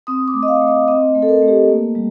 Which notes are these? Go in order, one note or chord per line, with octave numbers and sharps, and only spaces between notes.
C4 D#6
D6
A3
D#5
F5
A3
D#5
C4 D#5
A3
A4
A#4
A3
G4
A#3
G3